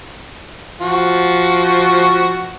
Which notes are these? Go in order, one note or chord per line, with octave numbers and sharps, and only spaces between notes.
F3 F#4